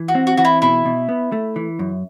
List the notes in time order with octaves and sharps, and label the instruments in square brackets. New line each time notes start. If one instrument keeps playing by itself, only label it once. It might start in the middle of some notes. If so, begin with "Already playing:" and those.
Already playing: [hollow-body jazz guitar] E3
[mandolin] F#4
[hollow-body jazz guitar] C4
[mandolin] F#4
[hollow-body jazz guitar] E3 [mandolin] F#4
[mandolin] E4
[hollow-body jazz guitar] B2 [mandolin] E4
[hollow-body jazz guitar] B2
B3
A3
E3
F#2